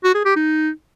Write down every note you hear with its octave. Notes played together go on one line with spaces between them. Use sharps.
F#4
G#4
G4
D#4